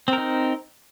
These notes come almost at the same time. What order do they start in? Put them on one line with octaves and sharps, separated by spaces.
C4 A#4 D#4